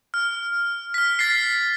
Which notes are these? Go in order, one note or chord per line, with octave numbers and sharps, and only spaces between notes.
F6
F6 B6
F6 A6 B6 C7